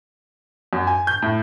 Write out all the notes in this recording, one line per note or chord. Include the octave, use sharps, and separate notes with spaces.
F#2
G#5
G6
A2